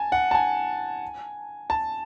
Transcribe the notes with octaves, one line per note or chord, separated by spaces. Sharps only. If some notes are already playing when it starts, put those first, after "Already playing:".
Already playing: G#5 A5
F#5
A5
G#5
A5